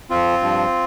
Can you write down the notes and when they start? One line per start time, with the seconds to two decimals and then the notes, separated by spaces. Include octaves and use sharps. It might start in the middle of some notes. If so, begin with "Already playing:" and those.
0.10 F2 F3 C4 F4
0.42 G2 F3